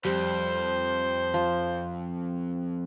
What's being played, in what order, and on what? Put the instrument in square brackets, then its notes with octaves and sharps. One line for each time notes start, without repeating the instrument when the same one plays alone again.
[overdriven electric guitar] F2 [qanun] G3 [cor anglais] C5
[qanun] F3